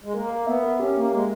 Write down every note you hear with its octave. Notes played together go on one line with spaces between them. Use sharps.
G#3
A#3 A#4
A#4
B3 E5
A#4
C#4 G4
A#3 E5
G#3 A#4